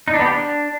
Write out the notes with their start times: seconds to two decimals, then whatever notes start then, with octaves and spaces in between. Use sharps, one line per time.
0.08 D#4
0.13 D4
0.19 B3
0.25 G4
0.31 D4